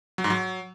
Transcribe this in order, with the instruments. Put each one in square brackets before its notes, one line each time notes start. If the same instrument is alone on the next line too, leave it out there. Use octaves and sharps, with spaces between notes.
[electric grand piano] F#3
G#2
F#3